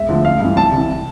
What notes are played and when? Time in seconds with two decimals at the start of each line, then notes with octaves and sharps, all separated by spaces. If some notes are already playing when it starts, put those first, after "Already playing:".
Already playing: E1 E5
0.09 D2 D3 F3
0.25 A1 F5
0.40 G2 E3
0.57 C2 A5
0.72 C3
0.77 E3